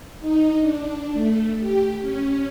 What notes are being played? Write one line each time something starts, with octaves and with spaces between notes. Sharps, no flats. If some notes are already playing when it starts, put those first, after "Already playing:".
D#4
D4
A3
G4
C#4